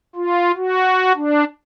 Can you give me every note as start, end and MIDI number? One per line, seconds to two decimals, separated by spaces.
0.16 0.52 65
0.56 1.13 66
1.16 1.44 62